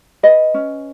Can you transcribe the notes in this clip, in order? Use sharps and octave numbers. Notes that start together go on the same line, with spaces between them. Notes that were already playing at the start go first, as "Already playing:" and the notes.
B4 D#5
C#4